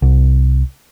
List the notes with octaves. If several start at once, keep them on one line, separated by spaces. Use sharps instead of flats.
C2